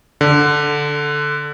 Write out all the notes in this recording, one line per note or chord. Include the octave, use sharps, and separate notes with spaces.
D3